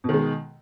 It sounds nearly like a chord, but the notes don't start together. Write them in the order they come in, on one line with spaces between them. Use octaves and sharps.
B2 D#3 G#3